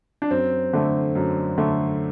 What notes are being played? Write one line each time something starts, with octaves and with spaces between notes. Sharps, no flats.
D4
F#2 C4
D3 A3
F#2
D3 A3